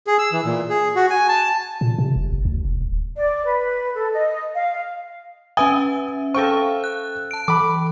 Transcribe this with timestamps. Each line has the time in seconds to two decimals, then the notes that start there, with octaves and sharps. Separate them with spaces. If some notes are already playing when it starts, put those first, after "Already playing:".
0.07 G#4
0.19 E6
0.33 E3
0.45 A#2
0.70 G#4
0.96 F#4
1.10 G#5
1.29 A5
1.81 A#2
1.98 C3
2.16 E1
2.32 F1
2.45 D2
2.65 E1
2.81 D1
3.17 D5
3.45 B4
3.94 A4
4.12 D#5
4.55 F5
5.57 C#4 B4 E5 G#5 D#6
6.34 A4 C5 F5 G5 C#6
6.84 F#6
7.31 A5 D7
7.48 E3 B5 D6